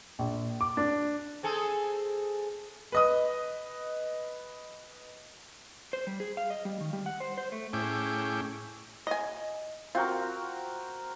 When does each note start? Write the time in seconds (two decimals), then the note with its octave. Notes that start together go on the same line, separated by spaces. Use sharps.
0.19 A#1
0.61 D6
0.77 D4
1.43 C4 G#4 A4
2.92 B4 D#5 D#6
5.93 C5
6.07 G3
6.20 G#4
6.37 F5
6.50 D#5
6.65 G3
6.81 D#3
6.93 G3
7.06 F#5
7.20 C5
7.38 C5
7.52 A3
7.73 A2 C#4 E4 G#4 G5 D6
9.07 D#5 G#5
9.95 C4 F4 F#4 A#4